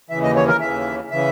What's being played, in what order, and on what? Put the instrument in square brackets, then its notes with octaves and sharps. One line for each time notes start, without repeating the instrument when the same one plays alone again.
[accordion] D#2 C#3 E3 E5
D#5
C#5
A#4
D#2 C#3 E3 E5
C#3 E3 E5